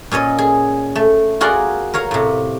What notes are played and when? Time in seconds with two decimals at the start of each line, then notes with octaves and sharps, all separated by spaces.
0.11 A#2 C#4 C#5 D#5
0.38 G#4
0.95 A3
1.41 F4 F#4 G#4 A#4 D5 F#5
1.94 A#4 C#5 F5 A#5
2.11 A2 C3